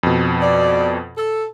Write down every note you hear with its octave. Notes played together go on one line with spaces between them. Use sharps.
F2 B2
D5
A4